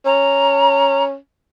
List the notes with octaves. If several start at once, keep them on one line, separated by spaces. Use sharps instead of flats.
C#4 A#5